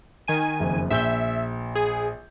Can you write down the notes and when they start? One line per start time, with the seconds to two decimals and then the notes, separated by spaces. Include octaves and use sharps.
0.28 D#3 G#5 D#7
0.60 F#1 F2
0.91 A#1 E5 G6 G7
1.75 G#4